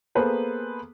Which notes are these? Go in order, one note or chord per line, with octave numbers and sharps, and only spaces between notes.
A#3 B3 G#4 A4 B4 C5